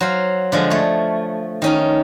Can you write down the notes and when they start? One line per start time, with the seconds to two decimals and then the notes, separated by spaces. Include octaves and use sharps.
0.01 F#3 C5 F5
0.52 D3 F3 G#3
0.70 A3 C#5
1.62 D#3 C#4 D#4